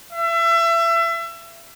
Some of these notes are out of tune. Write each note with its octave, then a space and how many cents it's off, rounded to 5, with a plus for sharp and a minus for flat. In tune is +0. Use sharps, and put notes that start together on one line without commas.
E5 +30